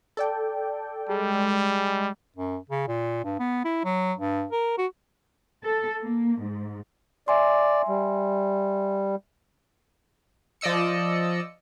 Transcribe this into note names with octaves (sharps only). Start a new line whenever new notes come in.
A4 D5 G5
G3 G#3
F#2
C#3
A#2
G2
B3
E4
F#3
G2
A#4
F#4
A4
A#3
G#2
D5 E5 G#5 C6
G3
F3 D5 D#5 E6 C#7